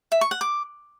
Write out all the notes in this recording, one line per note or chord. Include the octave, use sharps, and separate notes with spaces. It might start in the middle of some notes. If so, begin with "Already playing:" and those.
E5
C#6
F#5
D6